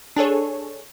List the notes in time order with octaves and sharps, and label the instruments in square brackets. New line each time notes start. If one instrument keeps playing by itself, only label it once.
[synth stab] D4 G#4 A4 C#5